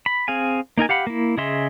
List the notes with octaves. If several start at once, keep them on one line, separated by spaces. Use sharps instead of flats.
B5
C4 G#4 F5 G#5
A#3 D#4 A#4 G#5
G4 F5 F#5 B5
A#3 E4
C#3 G#4 D#5 E5 C6